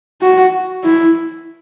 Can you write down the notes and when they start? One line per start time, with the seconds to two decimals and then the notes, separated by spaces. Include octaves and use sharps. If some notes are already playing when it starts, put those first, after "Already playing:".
0.21 F#4
0.84 E4